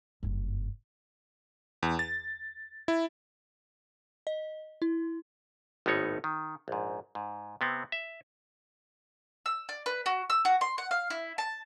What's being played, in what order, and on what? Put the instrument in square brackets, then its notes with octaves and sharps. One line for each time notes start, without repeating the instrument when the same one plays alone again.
[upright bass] F#1 G2
[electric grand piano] E2
A6
E4
[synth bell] D#5
E4
[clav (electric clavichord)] G#1 A2 B3 D#4 C#5
D#3
A#1 G#2
G#2
C3 B3 C4
E5
[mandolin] E6
D5
B4
F#4
E6
F#4
C6
F#5
F5
E4
A5